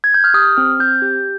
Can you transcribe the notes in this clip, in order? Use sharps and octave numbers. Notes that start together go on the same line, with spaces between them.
G#6
G6
F6
G4 D#6
C4 F6
C4 G6
G4